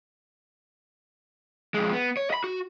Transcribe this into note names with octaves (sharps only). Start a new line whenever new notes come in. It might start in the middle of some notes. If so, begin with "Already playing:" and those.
F2 G#3
B3
C#5
D#5 B5
F#4